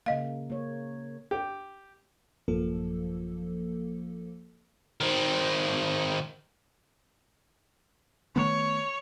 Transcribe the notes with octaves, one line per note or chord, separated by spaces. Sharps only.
C#3 A#3 D#5 F5
A#3 C#5
G4
A1 F#2 F3 A#3 A4
D#3 C4
D#3 A3 B3 C#5